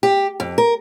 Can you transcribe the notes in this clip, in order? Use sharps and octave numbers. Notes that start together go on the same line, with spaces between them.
G4
F2
A#4